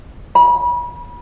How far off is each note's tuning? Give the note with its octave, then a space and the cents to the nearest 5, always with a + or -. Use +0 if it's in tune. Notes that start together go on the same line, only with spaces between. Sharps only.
B5 -35